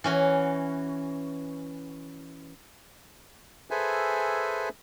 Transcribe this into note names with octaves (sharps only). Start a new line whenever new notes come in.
E3 C#4 F#4
G#4 A4 B4 C5 E5 G#5